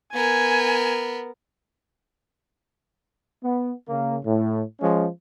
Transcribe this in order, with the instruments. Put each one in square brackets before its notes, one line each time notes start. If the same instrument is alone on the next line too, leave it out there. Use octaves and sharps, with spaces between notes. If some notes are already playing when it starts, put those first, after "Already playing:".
[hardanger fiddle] B3 A#4 [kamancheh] G#5
[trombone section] B3
C#3 A#3
A2
F3 G#3 C#4